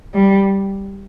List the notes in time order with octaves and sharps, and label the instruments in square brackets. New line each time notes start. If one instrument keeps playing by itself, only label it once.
[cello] G3